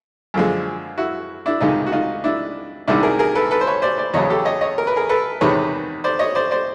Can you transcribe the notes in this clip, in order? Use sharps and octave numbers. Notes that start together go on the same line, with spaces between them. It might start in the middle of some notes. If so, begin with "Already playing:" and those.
F#2 D3 F3 G#3
E4 F#4
D4 E4
C#2 C3 D#3 G#3 D#4 F4
F#4
D#4 F4
D4 E4
C2 C3 D#3 G#3 D4 E4
G#4 A#4
G#4 A#4
A4 B4
A4 B4
C5
B4 C#5
C5 D5
C5 D5
E2 C#3 F#3 C#5 D#5
G4 A4
C#5 D#5
C#5 D#5
A#4
B4
G#4 A#4
A4 B4
E2 C3 D#3 G#3 B4 C#5
C5 D5
C#5 D#5
C5 D5
C5 D5